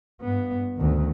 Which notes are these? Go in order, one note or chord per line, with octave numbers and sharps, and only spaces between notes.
G2 B3
D2 D#3